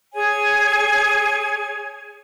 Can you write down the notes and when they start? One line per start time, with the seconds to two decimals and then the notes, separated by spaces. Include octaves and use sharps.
0.13 G#4 C#5 G#5